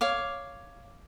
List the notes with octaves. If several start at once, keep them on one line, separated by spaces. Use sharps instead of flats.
C#5 F5 D6